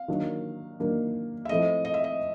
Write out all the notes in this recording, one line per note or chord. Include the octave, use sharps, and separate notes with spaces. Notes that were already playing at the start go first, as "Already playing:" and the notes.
Already playing: F5
D#3 F#3 A#3 D4
D#3 F#3 A#3 D4
E5
F3 A3 C4 E4 D#5
D#5
E5
D#5